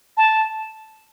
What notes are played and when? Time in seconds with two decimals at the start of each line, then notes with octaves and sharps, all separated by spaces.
0.17 A5